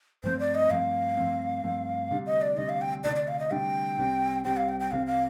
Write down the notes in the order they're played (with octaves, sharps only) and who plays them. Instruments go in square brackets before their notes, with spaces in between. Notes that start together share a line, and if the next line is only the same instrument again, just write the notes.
[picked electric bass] G2 F3 A3 C4 [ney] C5
[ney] D5
D#5
[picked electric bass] G2 F3 A3 C4 [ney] F5
[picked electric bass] G2 F3 A3 C4
G2 F3 A3 C4
D2 C3 G3 D4
[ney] D#5
D5
[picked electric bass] D2 C3 G3 D4 [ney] D#5
[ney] F5
G5
[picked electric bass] D2 C3 G3 D4 [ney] D5
[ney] D5
F5
D#5
[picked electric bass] D2 C3 G3 D4 [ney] G5
[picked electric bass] C2 C3 G3 C4
[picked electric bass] C2 C3 G3 C4 [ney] G5
[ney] F5
G5
G5
[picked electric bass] C2 C3 G3 C4 [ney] F5
[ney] F5